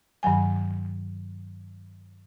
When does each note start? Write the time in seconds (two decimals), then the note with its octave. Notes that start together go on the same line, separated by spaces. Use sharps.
0.23 G2 D#3 F#3 G#5